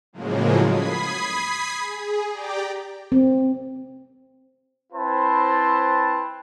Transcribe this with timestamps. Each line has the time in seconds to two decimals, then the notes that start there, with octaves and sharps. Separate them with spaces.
0.13 A2 C#3 F3 F#3 G#3 A#3
0.66 B5 D#6 G#6 B6 C7
1.79 G#4
2.32 G4 D5 G5 A#5 D6
3.12 C4
4.93 C4 E4 B4 C5 A5